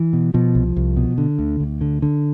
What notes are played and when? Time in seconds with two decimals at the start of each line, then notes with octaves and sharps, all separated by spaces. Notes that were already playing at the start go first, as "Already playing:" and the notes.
Already playing: E3
0.13 B2
0.34 B2 F3
0.55 C2
0.76 C2
0.97 B2
1.18 D3
1.39 D2
1.60 D2
1.81 D3
2.02 D3